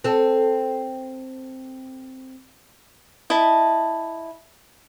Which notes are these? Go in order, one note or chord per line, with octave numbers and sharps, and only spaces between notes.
C4 A4
E4 D#5 A5